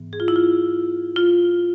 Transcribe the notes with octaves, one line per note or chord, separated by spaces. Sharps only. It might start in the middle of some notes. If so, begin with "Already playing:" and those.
Already playing: G#2 E3 B3
G#4
F4
E4
F4
F4